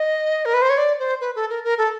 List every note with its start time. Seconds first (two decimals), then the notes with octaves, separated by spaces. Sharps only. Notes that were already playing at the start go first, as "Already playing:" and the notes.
Already playing: D#5
0.45 A#4
0.54 B4
0.62 C5
0.70 C#5
0.78 D5
0.99 C5
1.21 B4
1.36 A4
1.50 A#4
1.64 A#4
1.78 A4